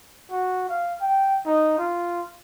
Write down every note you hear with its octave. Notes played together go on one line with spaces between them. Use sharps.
F#4
F5
G5
D#4
F4